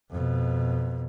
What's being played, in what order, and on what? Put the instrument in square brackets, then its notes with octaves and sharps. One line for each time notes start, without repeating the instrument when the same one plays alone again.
[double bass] F2 B2